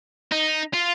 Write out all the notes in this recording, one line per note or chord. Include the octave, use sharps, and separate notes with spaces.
D#4
F4